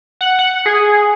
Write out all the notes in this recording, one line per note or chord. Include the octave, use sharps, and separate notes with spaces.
F#5
F#5
G#4